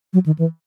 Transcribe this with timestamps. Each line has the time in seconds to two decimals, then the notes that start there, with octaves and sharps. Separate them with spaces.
0.13 F#3
0.26 D#3
0.39 E3